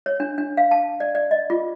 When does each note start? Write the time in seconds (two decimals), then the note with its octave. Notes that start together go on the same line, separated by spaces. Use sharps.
0.06 C#5
0.20 D4
0.38 D4
0.57 F5
0.71 A5
1.00 D5
1.15 D5
1.31 D#5
1.50 F4